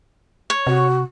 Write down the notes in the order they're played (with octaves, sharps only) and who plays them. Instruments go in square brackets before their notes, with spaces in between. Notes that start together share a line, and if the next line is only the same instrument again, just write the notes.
[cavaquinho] C#5
[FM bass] C3 [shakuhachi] F#4